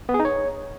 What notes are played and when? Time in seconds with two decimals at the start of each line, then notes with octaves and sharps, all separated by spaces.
0.09 B3
0.14 G#4
0.20 D#4
0.25 C#5